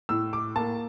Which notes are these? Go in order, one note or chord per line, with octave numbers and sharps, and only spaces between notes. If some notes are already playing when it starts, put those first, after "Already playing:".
A2 E6
D6
A#3 A5